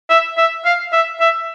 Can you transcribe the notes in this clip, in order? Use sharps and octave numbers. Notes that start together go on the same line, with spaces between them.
E5
E5
F5
E5
E5